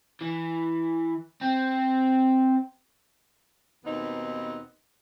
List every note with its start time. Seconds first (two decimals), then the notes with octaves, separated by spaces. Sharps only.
0.21 E3
1.41 C4
3.85 D#2 B2 B3 C4 D#4